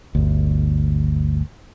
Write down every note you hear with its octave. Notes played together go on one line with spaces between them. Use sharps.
G1 D2